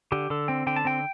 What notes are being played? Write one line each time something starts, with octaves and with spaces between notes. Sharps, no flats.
D3 G4
D3 A4
C4 G5
D3 G5
A5
C4 G5